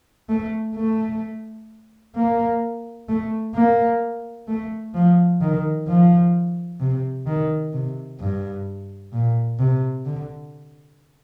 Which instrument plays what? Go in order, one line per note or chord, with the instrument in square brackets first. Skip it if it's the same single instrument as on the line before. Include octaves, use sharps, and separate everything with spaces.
[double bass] A3
A3
A#3
A3
A#3
A3
F3
D#3
F3
C3
D#3
C3
G2
A#2
C3
D3